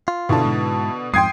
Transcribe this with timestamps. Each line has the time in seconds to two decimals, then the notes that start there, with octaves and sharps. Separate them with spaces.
0.08 F4
0.29 B2 D3 E4 A5
0.45 G#2
1.14 F2 G#2 G5 C6 D#6 G#6 C7